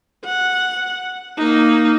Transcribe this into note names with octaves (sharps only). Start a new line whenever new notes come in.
F#5
A#3 D#4